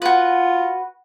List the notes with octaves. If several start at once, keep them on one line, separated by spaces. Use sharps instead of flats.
F4 F#4 B4